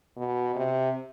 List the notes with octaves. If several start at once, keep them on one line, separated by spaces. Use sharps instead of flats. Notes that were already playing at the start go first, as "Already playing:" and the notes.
B2
C3